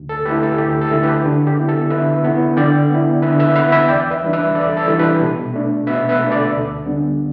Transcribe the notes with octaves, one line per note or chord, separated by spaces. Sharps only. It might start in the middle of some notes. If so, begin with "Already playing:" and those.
Already playing: D2
A4
D3 A3 E4 G4 B4
A4
D2 G4
A4
D3 A3 E4
G4 B4
D3
G4
B3 E4
A4
D3 B4 E5
B3 E4
D3 D5 G5
B3 E4
D3 B4 E5
B4 E5
B3 E4 B4 E5
B4 E5
E2 D5 G5
B4 E5
E3 G3 D4
B4 E5
E2 A4 D5
A4
E3 G3 D4
G4 B4
B2
A3 D4
B2 B4 E5
B4 E5
A3
D4
A4 D5
D2
D3 G3 B3 D4